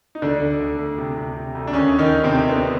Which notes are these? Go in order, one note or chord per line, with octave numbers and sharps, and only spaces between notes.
D#4
D2 D3 D4
D2
D2
D2
C3
C3
C3
D2
D4
D#2 C#3 C#4
D#2
D#3 D#4
D3
C3 C4
D3
D3 B3